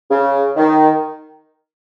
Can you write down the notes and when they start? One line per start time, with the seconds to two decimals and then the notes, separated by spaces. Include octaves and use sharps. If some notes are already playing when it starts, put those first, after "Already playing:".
0.11 C#3
0.56 D#3